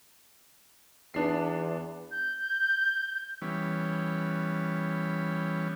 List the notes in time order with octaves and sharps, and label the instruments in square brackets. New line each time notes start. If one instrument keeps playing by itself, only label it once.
[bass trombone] E2 [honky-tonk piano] B3 D4 C7
[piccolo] G6
[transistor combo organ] E3 G3 B3 C#4